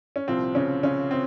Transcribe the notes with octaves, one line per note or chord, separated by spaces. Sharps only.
C#4
C2 A#2 F3 C4
C#3 C#4
C#3 C#4
C4